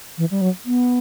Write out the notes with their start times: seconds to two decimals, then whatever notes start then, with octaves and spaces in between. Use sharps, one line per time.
0.18 E3
0.31 G3
0.41 F#3
0.66 B3